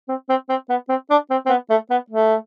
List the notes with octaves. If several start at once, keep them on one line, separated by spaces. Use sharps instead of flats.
C4
C4
C4
B3
C4
D4
C4
C4
B3
A3
B3
A3